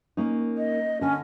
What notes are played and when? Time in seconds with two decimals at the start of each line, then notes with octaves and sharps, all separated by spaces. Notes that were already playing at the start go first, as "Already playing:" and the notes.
0.17 A#3 C#4 D#4
0.57 D#5
1.01 D3 C#4 G#5